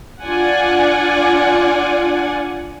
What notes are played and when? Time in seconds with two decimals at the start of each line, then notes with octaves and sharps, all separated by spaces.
0.24 D4 F4 D5 F#5 G#5